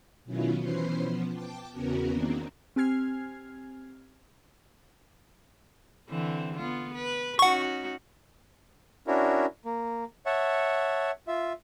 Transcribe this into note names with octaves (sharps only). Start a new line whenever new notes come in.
B2 D#3 F#3 C#4 E4 F4
B2 E3 C#4 B4 C5 C7
F3 B3
G5 A5 D6
E2 C#3 B3 C#4 F#4 A#4
D#3 A#3 C4 D4
C4 G4 G#5 F6 G#6 C7
D3 E3 C4
B3 F4
B4
C#4 D#4 F#4 F#5 C#6
C#4 D4 E4 F#4 A#4
A#3
C#5 E5 F#5 A5
F4 E5